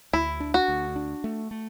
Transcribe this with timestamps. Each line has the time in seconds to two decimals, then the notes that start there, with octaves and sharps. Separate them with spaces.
0.13 D2 E4
0.40 D4
0.54 F#4
0.68 D2
0.96 D4
1.24 A3
1.51 A3